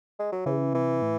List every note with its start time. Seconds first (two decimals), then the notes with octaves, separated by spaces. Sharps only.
0.19 G#3
0.32 F#3
0.46 C#3 E3
0.73 C3 E3
1.02 A2